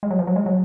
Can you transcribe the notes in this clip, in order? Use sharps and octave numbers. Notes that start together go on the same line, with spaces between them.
G#3
F#3
F3
F#3
G#3
F#3